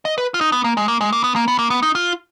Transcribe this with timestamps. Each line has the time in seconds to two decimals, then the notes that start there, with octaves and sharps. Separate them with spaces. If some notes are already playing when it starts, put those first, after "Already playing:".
0.05 D#5
0.18 B4
0.34 F4
0.41 D#4
0.52 B3
0.64 A#3
0.77 G#3
0.88 A#3
1.01 G#3
1.12 A#3
1.24 B3
1.36 A#3
1.48 B3
1.59 A#3
1.70 B3
1.83 D#4
1.95 F4